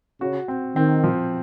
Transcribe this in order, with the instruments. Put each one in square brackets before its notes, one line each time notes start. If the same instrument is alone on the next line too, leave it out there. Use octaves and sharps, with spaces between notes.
[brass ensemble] C#3 [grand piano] F#4
[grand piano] C4
[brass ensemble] D#3 [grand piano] C4
[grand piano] F3